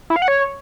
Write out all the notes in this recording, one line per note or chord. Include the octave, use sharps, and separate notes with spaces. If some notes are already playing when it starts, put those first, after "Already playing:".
E4
F5
F#5
C#5